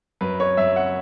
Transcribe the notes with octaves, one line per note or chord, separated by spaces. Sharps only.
F#2 B4
C#5
F#2 E5
F#5